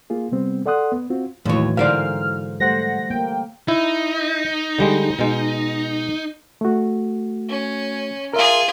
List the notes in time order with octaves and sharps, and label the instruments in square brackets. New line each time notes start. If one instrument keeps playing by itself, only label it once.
[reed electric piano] A#3 F4 G#4
C3 G3 B3 C4
A4 D5 F#5 C6 D#6 F#6
B3
C4 F4 F#4
[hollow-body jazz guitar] D#2 C#5 [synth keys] A2 [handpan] E3 F#3
[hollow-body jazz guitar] G#2 A#4 D5 [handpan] D3 C5 F5 [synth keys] F6
[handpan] G3 A3 C5 [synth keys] F#5 A#6
[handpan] A#3 [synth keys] G5
[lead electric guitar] D#4 [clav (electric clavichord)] E4
[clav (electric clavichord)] D3 G3 G#3
B2 G#3
[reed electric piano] A3 F#4
[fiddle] C#4
[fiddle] F4 G#4 [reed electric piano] A#4 E5